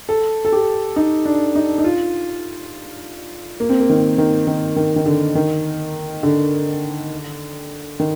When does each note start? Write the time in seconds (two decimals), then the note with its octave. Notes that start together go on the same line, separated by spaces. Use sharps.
0.09 A4
0.45 A4
0.52 G4
0.96 D#4
1.25 D4
1.55 D#4
1.78 D#4
1.84 F4
3.60 A#3
3.69 C4
3.80 A#3
3.90 D#3
4.18 D#3
4.47 D#3
4.76 D#3
4.96 D#3
5.06 D3
5.35 D#3
6.23 D3
8.00 D#3